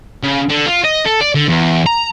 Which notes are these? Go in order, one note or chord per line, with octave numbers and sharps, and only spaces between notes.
C#3
D3
F4
D#5
A4
D5
D3
E2
A#5